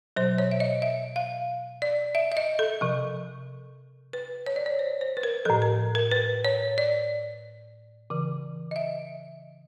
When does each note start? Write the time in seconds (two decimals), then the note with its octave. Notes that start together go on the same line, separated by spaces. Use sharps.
0.16 B2 F#3 C5
0.38 C#5
0.52 E5
0.60 D#5
0.82 E5
1.16 F5
1.82 D5
2.15 E5
2.32 E5
2.37 D#5
2.59 A4
2.81 C3 F3
4.13 B4
4.46 C#5
4.56 D5
4.66 C#5
4.79 C5
5.01 C5
5.17 B4
5.23 A#4
5.45 A2 F3 A4
5.62 A#4
5.95 A#4
6.11 B4
6.45 C#5
6.78 D5
8.10 C#3 E3
8.71 D#5
8.76 E5